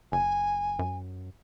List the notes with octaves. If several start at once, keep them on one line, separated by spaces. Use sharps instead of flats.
F#1 G#5
F#2